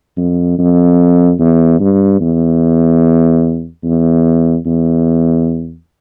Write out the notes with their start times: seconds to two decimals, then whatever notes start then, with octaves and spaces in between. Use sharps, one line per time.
0.17 F2
0.59 F2
1.40 E2
1.80 G2
2.20 E2
3.84 E2
4.66 E2